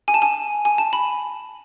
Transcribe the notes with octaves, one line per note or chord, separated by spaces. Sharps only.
G#5
A5
G#5
G#5
A5
B5